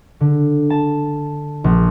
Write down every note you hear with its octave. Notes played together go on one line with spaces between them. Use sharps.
D3
A5
A#1